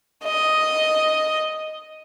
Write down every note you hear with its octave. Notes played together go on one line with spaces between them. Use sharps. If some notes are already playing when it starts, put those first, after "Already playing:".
D#5